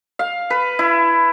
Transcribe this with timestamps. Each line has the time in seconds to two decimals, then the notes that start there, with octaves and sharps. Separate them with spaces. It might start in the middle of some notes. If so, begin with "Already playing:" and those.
0.19 F5
0.50 B4
0.79 E4